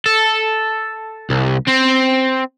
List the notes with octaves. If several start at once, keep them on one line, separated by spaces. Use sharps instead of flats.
A4
C2
C4